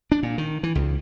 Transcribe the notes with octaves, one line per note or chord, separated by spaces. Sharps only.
D4
A#2
D#3
E3
C#2